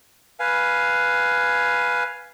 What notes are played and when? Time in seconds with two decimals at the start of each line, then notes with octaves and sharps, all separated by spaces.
0.40 B4 F5 G#5